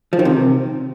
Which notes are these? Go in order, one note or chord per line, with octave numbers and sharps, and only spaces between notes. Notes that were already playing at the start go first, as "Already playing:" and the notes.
F3
D#3
C3